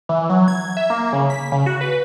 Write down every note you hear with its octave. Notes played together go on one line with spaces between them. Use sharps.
E3
F#3
G#6
E5
A#3
C#3
B6
C#3
F#4
B4